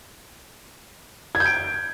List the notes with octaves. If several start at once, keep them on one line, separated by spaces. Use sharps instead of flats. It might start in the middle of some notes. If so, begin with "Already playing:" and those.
G#6
G6
D7